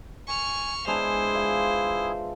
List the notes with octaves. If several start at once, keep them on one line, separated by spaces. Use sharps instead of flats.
G#5 C#6 F6
G#3 B3 D4 E4 G#4 C5
F4 D5 E5